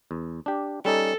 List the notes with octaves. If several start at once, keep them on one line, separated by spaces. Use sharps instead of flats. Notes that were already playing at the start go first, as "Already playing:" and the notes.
E2
D4 G4
G3 C#4 D#4 A4